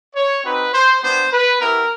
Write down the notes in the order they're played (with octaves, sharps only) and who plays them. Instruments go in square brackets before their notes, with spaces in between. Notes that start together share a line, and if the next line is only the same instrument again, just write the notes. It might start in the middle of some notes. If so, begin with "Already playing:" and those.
[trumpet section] C#5
C4 D#4 F#4 B4
C5
G3 B3 D4 C5
B4
B3 E4 G4 A#4